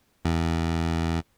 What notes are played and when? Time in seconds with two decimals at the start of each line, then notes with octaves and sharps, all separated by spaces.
0.25 E2